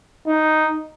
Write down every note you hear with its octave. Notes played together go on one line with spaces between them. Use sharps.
D#4